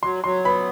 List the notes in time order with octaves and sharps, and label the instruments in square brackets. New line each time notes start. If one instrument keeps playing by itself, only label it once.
[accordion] F#3 [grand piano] C6
[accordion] F#3 [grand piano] C6
[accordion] B3 [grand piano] B5